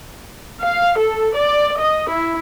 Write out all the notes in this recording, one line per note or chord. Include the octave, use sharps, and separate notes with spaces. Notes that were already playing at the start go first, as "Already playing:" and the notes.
F5
A4
D5
D#5
E4